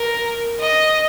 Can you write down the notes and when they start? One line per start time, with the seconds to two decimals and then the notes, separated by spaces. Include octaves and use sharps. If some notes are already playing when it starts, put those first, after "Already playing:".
Already playing: A#4
0.60 D#5